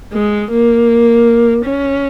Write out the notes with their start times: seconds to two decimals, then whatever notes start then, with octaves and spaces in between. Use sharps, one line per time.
0.13 G#3
0.51 A#3
1.65 C#4